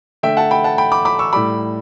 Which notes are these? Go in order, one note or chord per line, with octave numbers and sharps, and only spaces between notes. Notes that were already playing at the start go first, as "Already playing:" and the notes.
D3 A3 E5 G5
F#5 A5
G5 B5
F#5 A5
G5 B5
B5 D6
B5 D6
C#6 E6
A2 G3 B5 D6